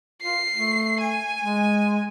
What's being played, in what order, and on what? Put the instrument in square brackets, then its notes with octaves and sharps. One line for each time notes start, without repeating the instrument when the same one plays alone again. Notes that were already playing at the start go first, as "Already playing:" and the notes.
[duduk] F4 [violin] C7
[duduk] A3
[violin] G#5
[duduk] G#3